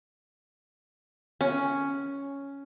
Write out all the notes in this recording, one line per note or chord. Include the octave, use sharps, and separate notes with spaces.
C#4